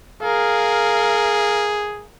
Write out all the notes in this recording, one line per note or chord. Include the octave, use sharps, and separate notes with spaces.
G#4 A#4 F5